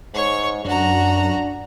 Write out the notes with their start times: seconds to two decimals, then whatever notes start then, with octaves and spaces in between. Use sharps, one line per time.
0.14 G#2 C#5 C#6
0.65 F#2 D4 F#4 A#5